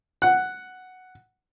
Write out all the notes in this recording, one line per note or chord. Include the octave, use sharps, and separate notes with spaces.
F#5